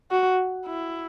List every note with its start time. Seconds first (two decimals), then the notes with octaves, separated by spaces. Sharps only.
0.11 F#4
0.67 E4